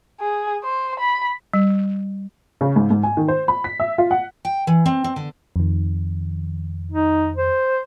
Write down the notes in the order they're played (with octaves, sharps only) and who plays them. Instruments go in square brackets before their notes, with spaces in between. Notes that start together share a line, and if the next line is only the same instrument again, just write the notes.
[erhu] G#4
C5
B5
[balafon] G3
[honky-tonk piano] C#3
G#2
G#2
G#5
D#3
C5
B5
B6
E5
F4
F#5
[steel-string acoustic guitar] G5
E3
C4
C4
D3
[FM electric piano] F2 D#3
[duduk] D#4
C5